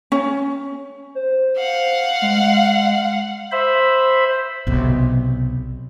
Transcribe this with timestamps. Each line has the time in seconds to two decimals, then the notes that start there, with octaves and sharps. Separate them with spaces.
0.12 C#4
1.15 C5
1.57 F5 F#5
2.22 G#3
3.52 C5 E5 B5
4.67 B1 C3